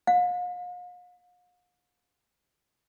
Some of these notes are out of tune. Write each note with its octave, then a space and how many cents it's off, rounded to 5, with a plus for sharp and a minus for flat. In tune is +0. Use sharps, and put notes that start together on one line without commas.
F5 +45